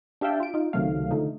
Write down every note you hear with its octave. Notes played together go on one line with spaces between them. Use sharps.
D4 G4 E5 F5 G5 A5
F4 D7
D#4 F4
C#2 C3 D#3 F#3 A3 F5
D3 F3 A3 D#4